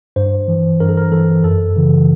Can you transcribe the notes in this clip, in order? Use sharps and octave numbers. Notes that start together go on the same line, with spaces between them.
G2 C5
E3
G2 A#4
A4
A#4
E3 A4
F#2 A4
C#3 E3